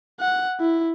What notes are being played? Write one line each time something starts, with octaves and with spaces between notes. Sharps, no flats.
F#5
E4